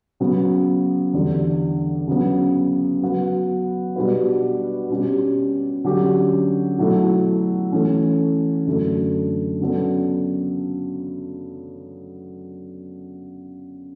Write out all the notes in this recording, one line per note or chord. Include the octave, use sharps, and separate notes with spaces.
C#3 F#3 B3
E2 D3 G3
C#3 F#3 B3
F#3 B3 F#4 B4
B2 G3 D4 F#4 B4
B2 G3 C#4 G4
D3 F#3 C#4 G4
B2 F#3 A3 E4 A4
E3 A3 C#4
F#2 D3 A3
C#3 F#3 B3 D4 A4